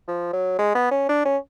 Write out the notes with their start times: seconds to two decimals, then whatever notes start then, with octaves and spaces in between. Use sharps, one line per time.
0.08 F3
0.33 F#3
0.59 G#3
0.75 B3
0.91 C#4
1.09 D4
1.25 C#4